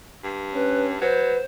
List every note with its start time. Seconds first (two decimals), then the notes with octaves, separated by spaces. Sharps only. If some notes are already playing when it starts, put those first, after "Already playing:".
0.24 G2
0.54 C#4 B4
1.01 F#3 B4 C5